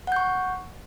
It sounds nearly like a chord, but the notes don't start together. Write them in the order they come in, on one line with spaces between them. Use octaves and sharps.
F#5 G6 C#6